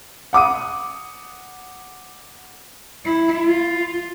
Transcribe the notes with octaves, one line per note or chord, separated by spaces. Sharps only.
F#5 D6 D#6 D#7
E4
F4